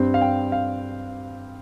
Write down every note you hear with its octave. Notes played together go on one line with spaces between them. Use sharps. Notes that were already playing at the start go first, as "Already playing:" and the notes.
Already playing: G2 G3 C4
F5
G5
F5